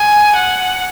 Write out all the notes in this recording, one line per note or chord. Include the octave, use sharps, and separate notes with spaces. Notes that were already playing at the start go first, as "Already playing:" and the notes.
Already playing: G#5
F#5